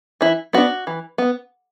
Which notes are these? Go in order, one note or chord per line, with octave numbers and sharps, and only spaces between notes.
E3 E4
B3 D4 F#4
E3
B3